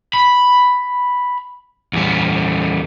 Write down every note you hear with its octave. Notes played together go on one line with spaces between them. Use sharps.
B5
E2 G3